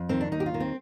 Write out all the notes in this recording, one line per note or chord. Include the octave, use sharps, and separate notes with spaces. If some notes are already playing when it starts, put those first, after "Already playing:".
Already playing: F2
D#3 C4
D4
D#2 D#4
G4
F4
D#3
C4